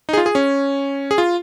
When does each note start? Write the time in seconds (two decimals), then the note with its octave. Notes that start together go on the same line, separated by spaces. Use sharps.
0.09 D#4
0.13 G#4
0.17 F4
0.26 G#4
0.35 C#4
1.11 G#4
1.18 F4